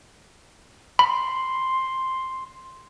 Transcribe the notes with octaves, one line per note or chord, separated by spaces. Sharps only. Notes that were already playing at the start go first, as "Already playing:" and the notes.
B5 C6